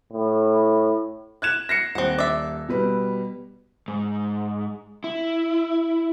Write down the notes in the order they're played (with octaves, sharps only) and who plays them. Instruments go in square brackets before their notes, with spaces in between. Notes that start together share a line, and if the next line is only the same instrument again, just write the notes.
[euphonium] A2
[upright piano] F#6 G#6 E7
A#6 C7 C#7
[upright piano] D#1 [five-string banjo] C4 F#5
[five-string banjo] D5 E5
[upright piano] B2 G3 B4
[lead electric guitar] G#2
E4